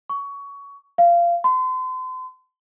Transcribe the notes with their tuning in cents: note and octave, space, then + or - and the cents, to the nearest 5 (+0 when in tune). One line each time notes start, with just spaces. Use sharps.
C#6 +20
F5 -20
C6 -40